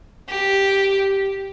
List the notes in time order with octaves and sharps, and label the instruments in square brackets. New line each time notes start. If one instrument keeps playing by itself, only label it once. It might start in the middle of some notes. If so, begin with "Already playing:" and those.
[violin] G4